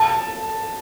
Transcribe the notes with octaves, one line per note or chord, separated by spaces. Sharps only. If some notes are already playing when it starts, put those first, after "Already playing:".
Already playing: A5